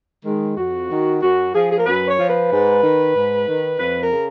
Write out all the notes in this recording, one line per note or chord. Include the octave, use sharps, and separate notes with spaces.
D#3 G#3
F2 F#4
D#3
F#2 F#4
F3 G#4
G#4
A#4
F#2 B4
C#5
F3
B4
G#2
D#3
G#2
D#3
F2 B4
A#4
C#3